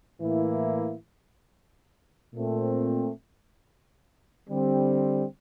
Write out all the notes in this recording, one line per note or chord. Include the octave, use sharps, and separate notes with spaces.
A2 E3 A#3 E4
A#2 A3 C4
D3 G3 C4